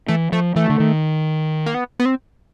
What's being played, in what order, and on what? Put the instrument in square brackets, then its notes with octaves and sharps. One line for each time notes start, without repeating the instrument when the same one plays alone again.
[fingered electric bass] E3 [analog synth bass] A3
[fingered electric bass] F3 [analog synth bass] A3
[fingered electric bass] E3 [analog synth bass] A3
[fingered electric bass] D3
D#3
[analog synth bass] A#3
B3
B3
C4